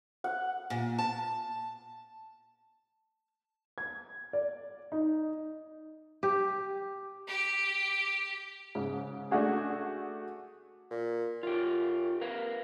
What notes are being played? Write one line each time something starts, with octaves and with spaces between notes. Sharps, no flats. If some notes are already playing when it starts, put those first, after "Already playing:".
F#5
A#2
A5
G#6
D5
D#4
G4
G4
G#2 C#3
A3 D4 F#4 G#4
A#2
F#2 F4 G4
A#4 B4 F5